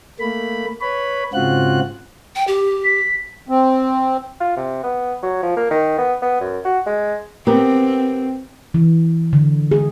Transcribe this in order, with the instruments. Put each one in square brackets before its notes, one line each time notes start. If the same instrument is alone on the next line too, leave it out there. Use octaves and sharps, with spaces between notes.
[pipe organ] A3 A#3 B5
B4 C#5 B5
G#2 C#3 C4 F4 F#4 F#6
[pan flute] G5
G4
[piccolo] B6
[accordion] C4
[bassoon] F4
C3
B3
F#3
F3
A#3
D#3
B3
B3
F#2
F#4
G#3
[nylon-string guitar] B3 G4 A#4 [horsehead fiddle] C4
[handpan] E3
D3
G#4